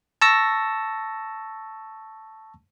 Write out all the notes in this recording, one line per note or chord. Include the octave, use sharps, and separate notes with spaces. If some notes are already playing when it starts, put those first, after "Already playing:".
A5 C#6 E6 A#6